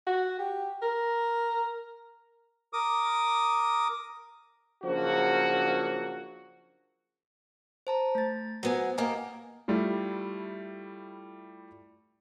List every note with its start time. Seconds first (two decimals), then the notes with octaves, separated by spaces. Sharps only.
0.07 F#4
0.39 G4
0.82 A#4
2.73 A#4 D6 D#6
4.84 C#3 F3 F#3 A#3 D4 F#4
7.87 C5 A5 A#5
8.15 A3 A6
8.63 F#3 B3 C5 G#5
8.98 A#3 G4 D#5 G#5 A#5
9.68 G3 A3 E4 F4